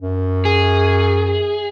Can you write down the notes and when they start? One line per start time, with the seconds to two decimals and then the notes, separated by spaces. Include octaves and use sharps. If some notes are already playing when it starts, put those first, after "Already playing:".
0.01 F#2
0.45 G#4